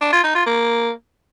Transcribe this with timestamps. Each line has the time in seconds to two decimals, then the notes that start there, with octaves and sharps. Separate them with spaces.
0.01 D4
0.12 F4
0.24 D#4
0.35 F4
0.46 A#3